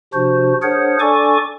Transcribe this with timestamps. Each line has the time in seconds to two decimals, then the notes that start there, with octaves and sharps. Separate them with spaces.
0.14 C3 F3 D4 F#4 C5
0.62 D4 G#4 A#4 C5 C#5 F#5
1.00 D4 A4 D5 G#5 C#6 D6